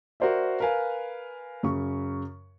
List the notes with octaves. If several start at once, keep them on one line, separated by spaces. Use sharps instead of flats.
F#4 A#4 C5 D5 E5
A#4 B4 F5 G#5
F#2 C#3 C#6